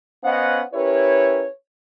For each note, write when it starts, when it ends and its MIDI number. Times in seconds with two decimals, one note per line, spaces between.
0.24 0.61 59
0.24 0.61 61
0.24 0.61 72
0.24 0.61 75
0.24 0.61 77
0.24 0.61 78
0.74 1.45 61
0.74 1.45 64
0.74 1.45 67
0.74 1.45 70
0.74 1.45 71
0.74 1.45 73